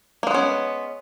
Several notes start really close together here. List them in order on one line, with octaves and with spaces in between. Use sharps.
A#3 G#3 B3 C#4